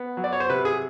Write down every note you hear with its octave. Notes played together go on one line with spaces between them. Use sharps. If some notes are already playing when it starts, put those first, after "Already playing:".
Already playing: B3
F#3
D5
C#5
C5
C3 B4
G#4